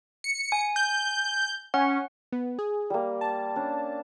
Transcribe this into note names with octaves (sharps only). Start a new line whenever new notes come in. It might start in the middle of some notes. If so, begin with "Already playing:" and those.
C#7
G#5
G6
C#4 F#5
B3
G#4
G3 A#3
A5
C#4 D4